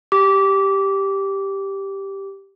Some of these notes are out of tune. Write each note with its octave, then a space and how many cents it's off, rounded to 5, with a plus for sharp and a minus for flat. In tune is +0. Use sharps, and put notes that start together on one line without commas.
G4 +0 D6 -20